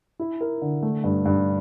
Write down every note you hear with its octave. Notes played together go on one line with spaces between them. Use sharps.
E4
A#4
D3
A3
G2
G2